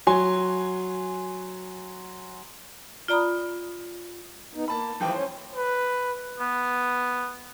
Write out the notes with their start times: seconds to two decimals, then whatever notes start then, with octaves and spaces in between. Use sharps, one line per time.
0.07 F#3 G#5 C6
3.08 F4 D5 A#5 B5 D#6
4.55 B3 D#4
4.68 A#3 A5 B5
5.00 D#1 E3 F3 G5
5.13 C#4 C5
5.56 B4
6.40 B3